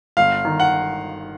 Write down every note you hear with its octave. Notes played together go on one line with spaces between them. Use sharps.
G1 F5
D#3
F#5